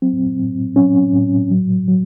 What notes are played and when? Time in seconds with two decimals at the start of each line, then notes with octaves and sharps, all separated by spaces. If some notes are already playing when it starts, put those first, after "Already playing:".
0.02 F#3 C4
0.39 A2
0.76 F#3 C#4
1.13 A2
1.51 F#3
1.88 F#3